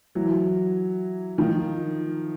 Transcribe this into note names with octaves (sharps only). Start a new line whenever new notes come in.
E3 F#3
D#3 F3